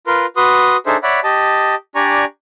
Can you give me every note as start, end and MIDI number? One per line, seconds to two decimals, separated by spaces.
0.07 0.26 65
0.07 0.26 70
0.07 0.26 71
0.07 0.26 84
0.36 0.77 66
0.36 0.77 71
0.36 0.77 84
0.36 0.77 87
0.86 0.97 62
0.86 0.97 63
0.86 0.97 68
0.86 0.97 69
0.86 0.97 72
0.86 0.97 76
1.03 1.20 73
1.03 1.20 74
1.03 1.20 76
1.03 1.20 78
1.03 1.20 83
1.24 1.75 67
1.24 1.75 75
1.24 1.75 81
1.95 2.25 62
1.95 2.25 67
1.95 2.25 74
1.95 2.25 80
1.95 2.25 82
1.95 2.25 85